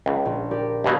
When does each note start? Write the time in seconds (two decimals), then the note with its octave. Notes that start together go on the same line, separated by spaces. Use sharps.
0.06 C#2
0.25 A#1
0.51 G4 A#4 D5
0.84 D#2 B2 F#3 G#4 B4 D#5